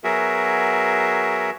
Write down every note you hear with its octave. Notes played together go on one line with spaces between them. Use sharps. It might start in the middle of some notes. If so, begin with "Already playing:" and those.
F#3 B3 F#4 G#4 A#4 E5